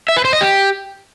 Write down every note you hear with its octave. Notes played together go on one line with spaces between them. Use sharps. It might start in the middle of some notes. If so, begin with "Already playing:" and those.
E5
B4
C5
D#5
G4